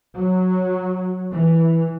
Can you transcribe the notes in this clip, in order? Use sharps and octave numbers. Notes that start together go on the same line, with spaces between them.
F#3
E3